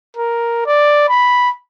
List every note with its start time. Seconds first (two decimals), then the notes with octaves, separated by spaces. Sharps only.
0.17 A#4
0.66 D5
1.09 B5